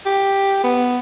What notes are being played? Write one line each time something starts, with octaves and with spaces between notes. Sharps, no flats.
G4
B3